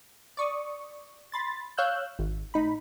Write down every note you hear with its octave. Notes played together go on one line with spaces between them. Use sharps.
D5 C#6 D#6
B5 C6 A6
C#5 F5 E6 F#6 G6
G#1
A2 D#4 B5